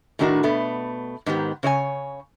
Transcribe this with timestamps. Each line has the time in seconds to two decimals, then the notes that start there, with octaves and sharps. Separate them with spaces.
0.19 A2 D#3 D4 F#4 A#4
0.43 B2 A3 B3
1.26 G#2 D#3 B3 G4
1.63 C#3 C#5 D#5 G#5